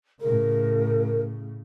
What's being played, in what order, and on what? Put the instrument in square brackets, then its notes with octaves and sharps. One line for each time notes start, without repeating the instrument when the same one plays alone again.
[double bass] A2 C#3 [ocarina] A#4